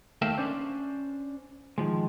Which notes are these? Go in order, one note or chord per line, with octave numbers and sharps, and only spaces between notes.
D#2 A3 A#4 E5 F5 G5
C#4 D4 C5
D#3 F3 G#3